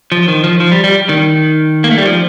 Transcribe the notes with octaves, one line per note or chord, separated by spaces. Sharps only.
F3
D#3
F3
F3
G3
G3
D#3
A#3
A3
G3
F3